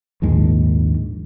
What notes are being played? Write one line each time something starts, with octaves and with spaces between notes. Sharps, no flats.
A#1 D#2 G#2 G#3